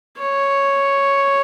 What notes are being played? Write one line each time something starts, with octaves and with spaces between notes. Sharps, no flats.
C#5